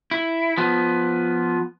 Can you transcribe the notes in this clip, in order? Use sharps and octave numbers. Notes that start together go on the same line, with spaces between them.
E4
F3 B3